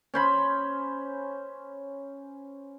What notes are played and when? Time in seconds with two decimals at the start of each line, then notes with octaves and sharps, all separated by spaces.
0.14 C#4 C5 B5